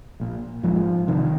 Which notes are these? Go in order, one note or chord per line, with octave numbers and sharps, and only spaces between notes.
A#1 A#2
A#1 G#2 F3
C2 C3 D#3